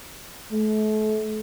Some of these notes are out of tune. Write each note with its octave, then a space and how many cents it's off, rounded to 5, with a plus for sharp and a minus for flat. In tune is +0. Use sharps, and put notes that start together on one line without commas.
A3 -35